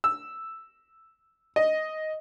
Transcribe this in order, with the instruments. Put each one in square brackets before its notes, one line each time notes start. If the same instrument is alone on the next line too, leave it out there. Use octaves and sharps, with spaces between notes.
[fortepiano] E6
D#5